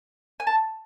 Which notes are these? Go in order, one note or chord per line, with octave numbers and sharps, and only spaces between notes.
G#5
A5